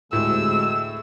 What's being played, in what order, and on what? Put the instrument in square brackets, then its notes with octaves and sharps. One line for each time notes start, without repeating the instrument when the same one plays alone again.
[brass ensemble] D2 C3 G#3 [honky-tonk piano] A2 [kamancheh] E6